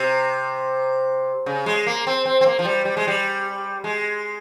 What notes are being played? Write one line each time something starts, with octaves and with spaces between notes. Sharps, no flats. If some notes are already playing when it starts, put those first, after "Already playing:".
Already playing: C3
C#3
G#3
A#3
C4
C4
C4
A#3
F3
G3
G3
G#3
G3
G#3